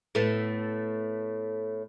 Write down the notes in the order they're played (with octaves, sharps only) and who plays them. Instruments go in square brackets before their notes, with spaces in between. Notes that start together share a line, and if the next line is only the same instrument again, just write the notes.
[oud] A2 A3 B3